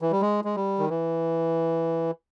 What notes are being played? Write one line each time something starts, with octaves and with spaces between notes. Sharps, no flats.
E3
G3
G#3
G#3
G3
D#3
E3